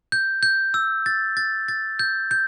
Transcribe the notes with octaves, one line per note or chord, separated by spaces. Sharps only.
G6
G6
E6
A6
A6
A6
G6
G6